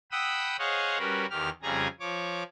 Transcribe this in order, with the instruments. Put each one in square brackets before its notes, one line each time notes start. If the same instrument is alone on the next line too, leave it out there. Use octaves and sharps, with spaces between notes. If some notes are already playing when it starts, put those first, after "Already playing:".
[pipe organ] F#5 G5 B5 D#6 E6
G#4 C5 C#5 D#5 F5 F#5
G3 C#4 F#4 A#4 B4
E2 D#3 G4 F6
F2 C#3 G3 G#4 G#5 A#5
F3 C#5 D6